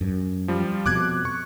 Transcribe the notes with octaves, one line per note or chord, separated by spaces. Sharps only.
F#2
F3 G3
F2 B2 D6 F#6 G#6
C#6